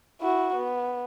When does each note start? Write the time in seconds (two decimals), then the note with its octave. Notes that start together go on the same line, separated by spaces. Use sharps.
0.21 E4 F#4
0.56 B3